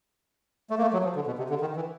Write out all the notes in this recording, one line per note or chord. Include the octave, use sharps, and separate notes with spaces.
A3
A#3
A3
F#3
F3
D3
B2
C3
D3
D#3
E3